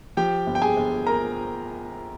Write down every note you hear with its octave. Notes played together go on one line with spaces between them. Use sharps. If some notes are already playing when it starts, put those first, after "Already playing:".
F3 G4 G5
G1
G5
G#4 G#5
G1
A#4 A#5